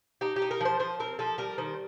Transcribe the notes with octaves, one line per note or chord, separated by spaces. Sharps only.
D#4 G4
G4
D#4
A#4
F3 C5
F3 C5
C4 A#4
F3 A4
G3 A#4
D#3 C5